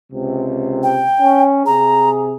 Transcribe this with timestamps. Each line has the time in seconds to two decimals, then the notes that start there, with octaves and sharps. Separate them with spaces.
0.12 C#2 C3
0.83 G5
1.20 C#4
1.66 C3 G#4 A#5